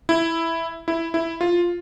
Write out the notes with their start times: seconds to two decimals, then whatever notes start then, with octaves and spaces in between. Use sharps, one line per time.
0.09 E4
0.88 E4
1.14 E4
1.41 F4